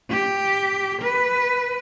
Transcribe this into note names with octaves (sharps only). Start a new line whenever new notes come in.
G4
B4